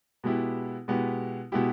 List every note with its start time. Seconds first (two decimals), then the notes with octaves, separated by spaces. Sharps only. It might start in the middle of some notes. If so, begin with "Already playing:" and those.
0.24 B2 G#3 B3 E4 G4
0.88 B2 G#3 B3 E4 G4
1.52 B2 G#3 B3 E4 G4